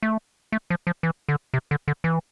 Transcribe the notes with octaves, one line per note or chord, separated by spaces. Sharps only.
A3
A3
F3
F3
E3
D3
C3
D3
D3
E3